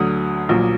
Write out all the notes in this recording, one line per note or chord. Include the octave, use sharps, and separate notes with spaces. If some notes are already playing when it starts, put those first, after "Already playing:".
Already playing: D2 D3 F#3 D#6
A#1 A#2 F#3